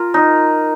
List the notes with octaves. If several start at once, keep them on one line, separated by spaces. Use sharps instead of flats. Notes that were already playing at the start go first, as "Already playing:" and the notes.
Already playing: F4 A#4
D#4